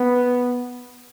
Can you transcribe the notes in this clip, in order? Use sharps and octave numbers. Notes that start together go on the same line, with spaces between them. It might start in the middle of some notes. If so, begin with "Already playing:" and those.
Already playing: B3